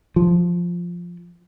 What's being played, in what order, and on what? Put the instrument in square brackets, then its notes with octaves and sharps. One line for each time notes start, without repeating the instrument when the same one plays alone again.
[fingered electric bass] F3